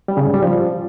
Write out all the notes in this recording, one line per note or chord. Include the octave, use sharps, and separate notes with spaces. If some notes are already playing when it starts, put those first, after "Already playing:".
G3
C#3
G#2
G3
F3